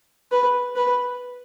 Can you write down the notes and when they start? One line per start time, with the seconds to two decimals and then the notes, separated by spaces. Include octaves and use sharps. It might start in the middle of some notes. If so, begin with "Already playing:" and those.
0.31 B4
0.76 B4